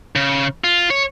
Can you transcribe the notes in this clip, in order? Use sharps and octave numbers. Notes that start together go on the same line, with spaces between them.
C#3
F4
C#5